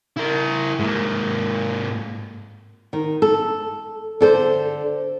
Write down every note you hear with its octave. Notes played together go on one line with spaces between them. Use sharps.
E4 A#4
G#2 A#3
D#3
A4
D3 A4 C5